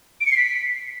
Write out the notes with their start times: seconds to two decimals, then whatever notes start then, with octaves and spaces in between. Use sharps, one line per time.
0.21 D7
0.26 C#7
0.32 C7
0.37 B6